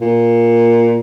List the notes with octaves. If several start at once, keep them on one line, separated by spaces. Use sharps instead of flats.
A#2